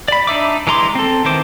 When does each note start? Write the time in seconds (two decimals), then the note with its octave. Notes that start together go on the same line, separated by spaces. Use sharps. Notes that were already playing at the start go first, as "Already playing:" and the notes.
0.08 D5 B5
0.27 D4 D#4 E5 D6
0.67 E3 G#3 A#5 C6 D6
0.95 C4 A4
1.25 D#3 E3 C5 D6